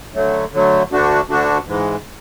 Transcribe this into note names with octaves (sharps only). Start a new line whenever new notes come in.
D3 F#3 A3
D3 F#3 A3
D2 D3 A3 D4 F#4
D2 D3 A3 D4 F#4
G#2 E3 G#3